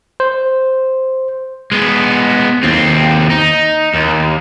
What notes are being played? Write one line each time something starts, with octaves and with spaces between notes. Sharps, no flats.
C5
G#3 B3
D#2 C4
D#4
D#2